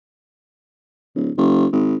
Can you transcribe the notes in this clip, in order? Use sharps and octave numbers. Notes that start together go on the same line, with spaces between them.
D1
F#1
G#1